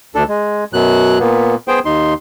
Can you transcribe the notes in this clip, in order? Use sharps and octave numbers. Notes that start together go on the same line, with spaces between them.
D2 D4 A4
G#3
F#2 B2 F#3 F#6
A#2 A#3 B3
B3 G#4 C5 G5
D#2 D#4 C6